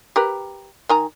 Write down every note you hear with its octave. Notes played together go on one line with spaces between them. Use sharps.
G4 A#4 B4
D#3 G#5 A#5